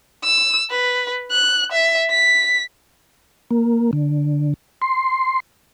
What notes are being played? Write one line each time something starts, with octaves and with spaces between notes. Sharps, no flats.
E6
B4
F#6
E5
B6
A#3
D3
C6